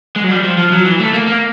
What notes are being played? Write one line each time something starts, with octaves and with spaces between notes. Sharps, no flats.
G#3
F#3
G3
F3
F3
F#3
E3
A3
A#3
A#3